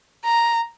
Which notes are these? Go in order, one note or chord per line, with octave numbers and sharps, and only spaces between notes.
A#5